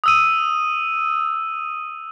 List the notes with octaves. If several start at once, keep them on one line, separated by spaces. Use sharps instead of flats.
D#6 E6 D#7